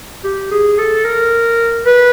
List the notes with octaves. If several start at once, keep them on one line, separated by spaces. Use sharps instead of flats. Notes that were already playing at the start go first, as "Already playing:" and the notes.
G4
G#4
A4
A#4
B4